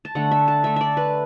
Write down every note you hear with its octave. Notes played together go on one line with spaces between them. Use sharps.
A5
D3 A3 F#5
E5
A5
D3 A3 E5
D5 E5
B4